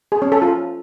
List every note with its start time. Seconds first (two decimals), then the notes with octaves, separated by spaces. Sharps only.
0.12 G#4
0.22 C#4
0.32 A4
0.42 F4